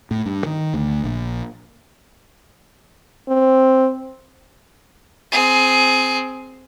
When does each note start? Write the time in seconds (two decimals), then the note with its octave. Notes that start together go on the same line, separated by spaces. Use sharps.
0.11 A2
0.26 G2
0.46 D#3
0.74 D2
1.04 A#1
3.28 C4
5.32 C4 G#4